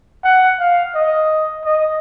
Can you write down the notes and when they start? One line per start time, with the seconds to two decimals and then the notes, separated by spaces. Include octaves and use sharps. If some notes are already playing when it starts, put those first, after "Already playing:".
0.24 F#5
0.59 F5
0.95 D#5
1.65 D#5